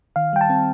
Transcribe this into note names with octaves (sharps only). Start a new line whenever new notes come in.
D#3 F5
G3 G5
A5
C4